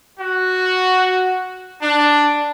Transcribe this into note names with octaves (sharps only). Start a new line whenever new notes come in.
F#4
D4